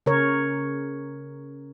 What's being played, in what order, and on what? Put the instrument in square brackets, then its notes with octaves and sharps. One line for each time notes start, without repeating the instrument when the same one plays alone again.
[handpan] C#3 A#4 C#5